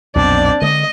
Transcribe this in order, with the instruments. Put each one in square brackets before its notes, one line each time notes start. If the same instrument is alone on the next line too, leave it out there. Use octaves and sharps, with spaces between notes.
[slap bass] B1 F2 A#2 [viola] C4 D5 [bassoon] D4
[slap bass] D3 G#3 [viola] D#5